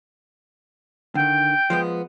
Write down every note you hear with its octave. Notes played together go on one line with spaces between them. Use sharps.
D3 D#3 G5
F3 G#3 B3